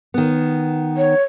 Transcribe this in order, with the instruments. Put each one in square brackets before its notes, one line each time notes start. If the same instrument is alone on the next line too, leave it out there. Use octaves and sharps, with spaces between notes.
[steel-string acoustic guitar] D#3 B3
[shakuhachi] C#5